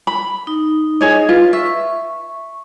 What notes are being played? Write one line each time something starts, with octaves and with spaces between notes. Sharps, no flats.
B5
D#4
G#4 C#5 D#5
F4 B4
E5 C#6